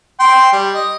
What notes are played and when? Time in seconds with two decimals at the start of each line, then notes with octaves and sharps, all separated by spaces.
0.20 G5 C6
0.53 G3
0.73 D#5